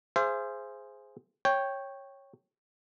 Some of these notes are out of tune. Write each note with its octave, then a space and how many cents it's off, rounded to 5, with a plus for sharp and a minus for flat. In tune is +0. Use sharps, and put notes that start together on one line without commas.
G#4 +0 C5 +0 E5 +45
C#5 -10 G5 +0